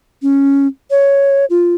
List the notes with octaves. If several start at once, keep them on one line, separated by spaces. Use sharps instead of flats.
C#4
C#5
F4